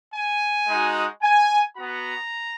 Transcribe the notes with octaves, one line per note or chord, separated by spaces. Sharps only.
G#5
G#3 D#4 F#4
G#5
F#4 A#5
B3